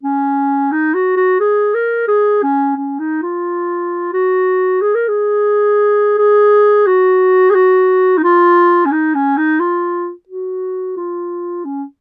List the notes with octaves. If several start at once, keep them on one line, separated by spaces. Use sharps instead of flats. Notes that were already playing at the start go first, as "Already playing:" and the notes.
C#4
D#4
F#4
F#4
G#4
A#4
G#4
C#4
C#4
D#4
F4
F#4
G#4
A#4
G#4
G#4
F#4
G#4
F#4
D#4
F4
C#4
D#4
C#4
D#4
F4
F#4
F4
C#4